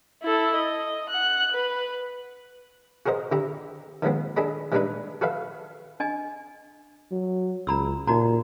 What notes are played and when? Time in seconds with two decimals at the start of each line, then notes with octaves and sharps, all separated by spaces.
0.22 E4 A4
0.56 D#5
1.09 F#5 F#6
1.52 B4
3.06 F#4 G#4 A#4 C5 D#5
3.32 D3 E4 G4 A#5
4.02 D#3 F3 G#3 B3 C4
4.37 D4 G#4 A4 D#5 B5
4.72 E3 G3 G#3 D4 D#4 B4
5.21 F#4 A4 B4 E5 F5
6.00 D4 D#5 G#5
7.12 F#3
7.67 C#2 A#5 B5 E6
8.07 A#2 D#4 F#4 A#5